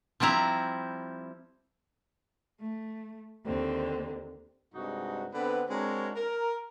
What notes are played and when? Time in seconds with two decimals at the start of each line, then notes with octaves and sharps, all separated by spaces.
0.20 F3 G3 C4 E4 A#5
2.60 A3
3.45 D#2 D3 C4
4.74 G2 C3 G#3 D#4 F#4
5.33 D3 B3 C4 B4
5.68 G#3 C4 D4 F#4 A#4 C#5
6.15 A#4